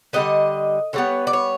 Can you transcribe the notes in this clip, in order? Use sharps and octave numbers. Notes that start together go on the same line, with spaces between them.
D3 G3 B3 D#5
D3 G3 B3 C#5
D5
C#5